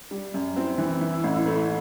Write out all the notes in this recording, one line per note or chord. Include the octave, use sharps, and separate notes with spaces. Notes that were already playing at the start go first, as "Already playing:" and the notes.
G3
F#2
C4 E4 F#4
E3
E3
A1
A3